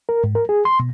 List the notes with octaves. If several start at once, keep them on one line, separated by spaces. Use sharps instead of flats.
A#4
G#2
A#4
G#4
C6
B2